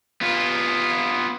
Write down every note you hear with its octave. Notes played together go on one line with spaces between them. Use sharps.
B3 F4